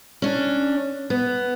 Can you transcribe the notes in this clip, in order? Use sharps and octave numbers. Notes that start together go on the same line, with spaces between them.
C#4 D4
B3